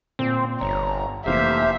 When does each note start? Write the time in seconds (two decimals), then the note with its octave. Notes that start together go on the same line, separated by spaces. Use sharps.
0.19 A#2 C4
0.61 G1 C#5 A#5
1.26 F1 C3 E3 A#3 G4 C5 E5 F5